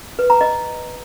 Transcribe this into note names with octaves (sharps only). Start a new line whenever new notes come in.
B4
A#5
D#5